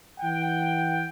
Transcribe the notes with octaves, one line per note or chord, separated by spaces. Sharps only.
E3 F#5 G5